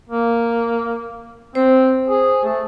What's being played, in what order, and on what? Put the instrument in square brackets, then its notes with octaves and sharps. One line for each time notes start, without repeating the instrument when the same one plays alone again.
[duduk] A#3
[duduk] C4 [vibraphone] C5
[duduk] G#4
A3